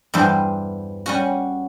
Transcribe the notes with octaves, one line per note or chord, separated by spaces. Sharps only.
E2 G2 E3 G3 C5
G3 C#4 F#4